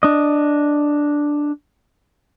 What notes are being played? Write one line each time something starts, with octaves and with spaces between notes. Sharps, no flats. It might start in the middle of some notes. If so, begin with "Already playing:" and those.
D4 D#5